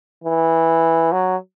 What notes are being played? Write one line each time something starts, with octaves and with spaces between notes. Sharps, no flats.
E3
F#3